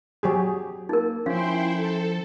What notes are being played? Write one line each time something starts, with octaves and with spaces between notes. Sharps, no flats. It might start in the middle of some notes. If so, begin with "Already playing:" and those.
F#3 G4 G#4
A#3 D#4 A#4
F3 C#4 E4 F5 G5 C6
A4